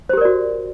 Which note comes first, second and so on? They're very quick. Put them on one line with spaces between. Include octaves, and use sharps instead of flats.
C5 G4 A#4 D5 F#4